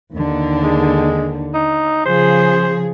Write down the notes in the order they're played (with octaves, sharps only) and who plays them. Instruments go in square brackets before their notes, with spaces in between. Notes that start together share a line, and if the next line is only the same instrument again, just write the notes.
[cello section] D#2 D3
[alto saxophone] G#3
D#4
[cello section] C#3 F3 G#4 [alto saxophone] C5